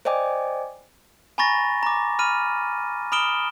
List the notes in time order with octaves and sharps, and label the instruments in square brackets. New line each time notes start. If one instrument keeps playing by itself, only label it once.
[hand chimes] C5 D5 D#5 G5 G#5 D6
[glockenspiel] G#5 A#5 B5 C#6 A6 A#6
A#5 D6
B5 F6 D#7
B5 D#6 F6 D7 E7 G7